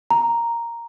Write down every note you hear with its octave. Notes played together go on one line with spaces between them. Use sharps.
A#5